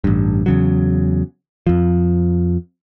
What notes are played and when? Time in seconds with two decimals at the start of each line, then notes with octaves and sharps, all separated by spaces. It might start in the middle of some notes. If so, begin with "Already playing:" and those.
0.04 A1 G2
0.46 E2 C#3 F#3
1.67 F2 F3